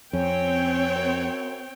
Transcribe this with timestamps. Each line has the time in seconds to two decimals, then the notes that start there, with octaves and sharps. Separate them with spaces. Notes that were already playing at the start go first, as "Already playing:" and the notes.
0.13 F2 C4 C#4 C#5 G5
0.96 F#2